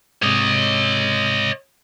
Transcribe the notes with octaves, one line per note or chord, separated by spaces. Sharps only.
G#2 C3 C#5 D#5